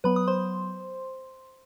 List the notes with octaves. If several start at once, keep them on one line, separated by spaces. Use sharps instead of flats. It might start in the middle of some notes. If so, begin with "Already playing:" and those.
F#3 B3 B4 B5
D#6
C5 C6